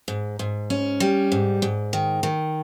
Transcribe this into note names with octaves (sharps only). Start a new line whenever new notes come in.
G#2
G#2
C#4
G3
G#2
G#2
D#3
D#3